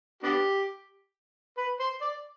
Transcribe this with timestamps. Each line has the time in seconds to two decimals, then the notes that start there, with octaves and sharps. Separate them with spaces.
0.23 B3 D4 G4
1.58 B4
1.80 C5
2.01 D5